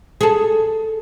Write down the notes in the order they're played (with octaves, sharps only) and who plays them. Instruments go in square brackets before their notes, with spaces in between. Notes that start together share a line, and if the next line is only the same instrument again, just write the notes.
[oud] G#4 A4